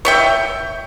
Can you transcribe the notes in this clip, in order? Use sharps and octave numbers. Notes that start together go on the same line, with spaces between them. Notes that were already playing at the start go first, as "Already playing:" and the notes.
C#5 E5 G5